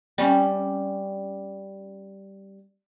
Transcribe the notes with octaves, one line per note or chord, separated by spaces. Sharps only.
G3 C#4